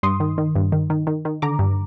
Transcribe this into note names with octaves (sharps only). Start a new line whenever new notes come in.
G2 C6 D#6
D#3
D#3
G2
D#3
D#3
D#3
D#3
D3 A#5 D6
G2